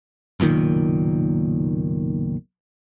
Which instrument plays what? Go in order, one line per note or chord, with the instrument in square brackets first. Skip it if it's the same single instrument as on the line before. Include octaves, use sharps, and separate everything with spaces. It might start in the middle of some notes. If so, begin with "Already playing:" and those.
[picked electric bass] F#1 B1 A#2 D#3